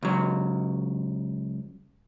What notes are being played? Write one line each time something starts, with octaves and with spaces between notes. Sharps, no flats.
C#2 F#3